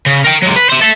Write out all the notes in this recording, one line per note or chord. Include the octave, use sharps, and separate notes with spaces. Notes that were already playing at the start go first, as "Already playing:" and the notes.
C#3
A#4 G5
F#3 G#3
B4
C5 E5
A4 E5